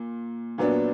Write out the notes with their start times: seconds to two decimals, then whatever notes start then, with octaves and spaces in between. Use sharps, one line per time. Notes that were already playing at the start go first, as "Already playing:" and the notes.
Already playing: A#2
0.58 A#2 F#3 B3 D4